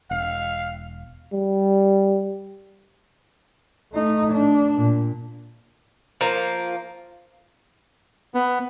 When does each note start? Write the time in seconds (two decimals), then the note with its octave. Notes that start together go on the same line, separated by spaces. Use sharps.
0.11 E1 F5
1.33 G3
3.93 A3 D#4
4.33 D4
4.76 A#2
6.21 F3 A#3
8.34 B3